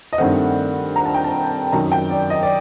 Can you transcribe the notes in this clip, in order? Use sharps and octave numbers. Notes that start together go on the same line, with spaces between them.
D#5
G2 D#3 A3 C4 F#5
A#5
A5
G5
A5
F#2 D#3 F#3 A#5
G5
D5
D#5
D5